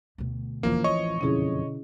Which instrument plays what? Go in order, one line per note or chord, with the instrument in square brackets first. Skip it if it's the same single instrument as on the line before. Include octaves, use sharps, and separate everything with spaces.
[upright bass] D2 B2
[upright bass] E1 D3 [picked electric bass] A1 E3 F3 [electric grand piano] A#3
[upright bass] D1 F4 [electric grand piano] C#5 D#5 C#6
[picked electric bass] F#1 F2 [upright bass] B2 D3 [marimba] C#4 E4 G#4